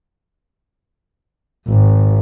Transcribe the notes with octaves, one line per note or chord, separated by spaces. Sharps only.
G#1